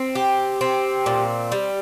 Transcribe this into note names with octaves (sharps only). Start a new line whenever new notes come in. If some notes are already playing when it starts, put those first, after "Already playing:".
Already playing: C4
G4
C4
A#2
G3